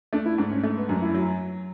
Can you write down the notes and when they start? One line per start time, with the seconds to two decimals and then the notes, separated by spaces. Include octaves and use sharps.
0.13 A3 D4
0.26 E4
0.38 G#2 D4
0.51 C#4
0.63 A3
0.77 B3
0.89 F#2 D4
1.02 E4
1.14 F#3